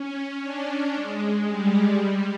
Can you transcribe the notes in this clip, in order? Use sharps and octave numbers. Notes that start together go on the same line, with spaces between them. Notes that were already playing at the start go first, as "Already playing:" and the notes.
Already playing: C#4
D4
G#3
G3
G3